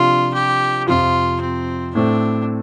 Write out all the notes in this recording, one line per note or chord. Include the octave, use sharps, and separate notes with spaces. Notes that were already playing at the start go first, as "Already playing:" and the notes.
Already playing: C3 F3 D4 F4
G4
F2 C3 F3 F4
C4
A2 A3 C4 D4